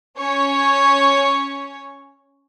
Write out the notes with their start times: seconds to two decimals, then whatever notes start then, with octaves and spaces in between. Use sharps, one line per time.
0.18 C#4 C#5